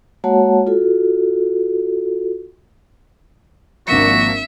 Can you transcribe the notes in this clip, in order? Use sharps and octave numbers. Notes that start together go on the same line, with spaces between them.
G#3 A#3 F#4 C#5 F#5 A5
F4 F#4 A4
G#1 F3 A#3 D4 F#4 E5 C#7